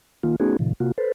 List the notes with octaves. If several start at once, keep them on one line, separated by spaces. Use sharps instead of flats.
D#3 A#3 F4
A3 B3 C#4 D#4 F#4 G#4
A2 C3 D#3 F3
C3 A#3 F4 F#4
A4 B4 C5